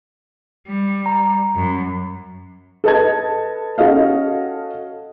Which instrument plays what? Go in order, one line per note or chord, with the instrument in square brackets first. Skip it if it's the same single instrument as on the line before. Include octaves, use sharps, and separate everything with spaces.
[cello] G3
[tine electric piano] A#5
[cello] F#2
[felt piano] A4 B4 D#5 A5 G#6
C#4 F#4 A4 D#5 F5